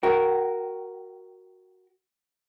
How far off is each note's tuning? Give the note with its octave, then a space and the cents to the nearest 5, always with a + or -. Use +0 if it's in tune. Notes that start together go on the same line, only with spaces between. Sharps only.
F#4 +0 A#4 +0 G5 -25